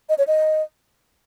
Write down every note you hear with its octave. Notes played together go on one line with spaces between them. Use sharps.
D#5
C#5
D#5